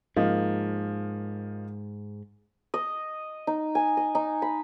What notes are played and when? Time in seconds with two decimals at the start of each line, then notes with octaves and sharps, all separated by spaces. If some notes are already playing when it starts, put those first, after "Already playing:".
0.17 G#2 F3 A#3 D#4
2.74 D#5
3.47 D#4
3.75 G#5
3.97 D#5
4.15 D#4
4.42 B5